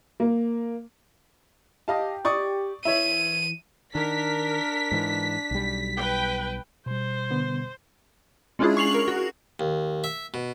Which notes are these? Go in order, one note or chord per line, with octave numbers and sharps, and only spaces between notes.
A#3
G4 D#5 F5 A5
D5 C#6 D#6
E3 C#5 E5 D#7
D#3 D4 A#4 B6
G#2 E3
B1 G3
B4 G5
B2 G3 C5
D3 B3
G#3 C#4 D4 E4 F4 G#4
C#6 C7 F7 F#7
A#4
F#4
D#2
E5
B2